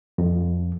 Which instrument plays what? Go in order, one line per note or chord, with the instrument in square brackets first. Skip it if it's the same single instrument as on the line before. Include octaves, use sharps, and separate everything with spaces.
[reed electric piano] F2